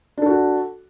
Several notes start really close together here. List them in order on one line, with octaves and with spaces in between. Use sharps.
D4 A4 F#4